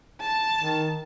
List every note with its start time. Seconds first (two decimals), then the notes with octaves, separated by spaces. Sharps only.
0.21 A5
0.57 D#3